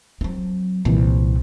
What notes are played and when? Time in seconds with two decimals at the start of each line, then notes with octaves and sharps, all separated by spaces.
0.21 F#3 C4
0.85 C2 A#2 E3